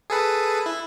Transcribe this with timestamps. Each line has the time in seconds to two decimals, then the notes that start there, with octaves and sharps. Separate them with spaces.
0.10 G#4 A4 B4
0.66 E4